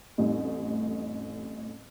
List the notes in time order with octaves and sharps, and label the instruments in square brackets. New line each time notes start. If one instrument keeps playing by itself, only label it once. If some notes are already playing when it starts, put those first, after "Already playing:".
[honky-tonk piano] A1 F2 A2 G3 D#4